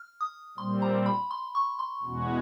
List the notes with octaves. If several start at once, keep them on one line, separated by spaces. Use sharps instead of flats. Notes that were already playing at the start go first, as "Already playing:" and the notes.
Already playing: F6
D#6
A#2 G3 C4 C6
A#5
B5
C6
C#6
C6
E2 B2 G#3 C#4 F#4